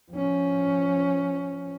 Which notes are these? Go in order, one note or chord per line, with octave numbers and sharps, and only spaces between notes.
F3 C#4